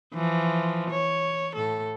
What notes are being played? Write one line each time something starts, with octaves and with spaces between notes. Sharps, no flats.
E3 F3
C#5
A2 A4